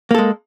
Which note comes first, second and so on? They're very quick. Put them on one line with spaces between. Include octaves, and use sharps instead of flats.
A#3 A4 G#3